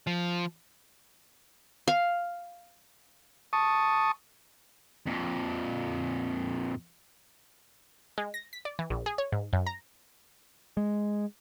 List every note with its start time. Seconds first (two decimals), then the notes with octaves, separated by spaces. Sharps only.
0.07 F3
1.88 F5
3.53 A5 C#6 D#6
5.07 F2 A#2
8.18 G#3
8.34 A#6
8.53 B6
8.65 D5
8.79 E3
8.90 A#1
9.06 G#4
9.18 C#5
9.32 G#2
9.53 F#2
9.66 A#5
10.77 G#3